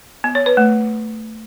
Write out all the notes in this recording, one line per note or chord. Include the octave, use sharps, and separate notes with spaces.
B3
C#5
B4
A3